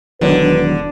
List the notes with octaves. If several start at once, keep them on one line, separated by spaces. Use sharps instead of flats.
E1 D3 D#3 F#3 B4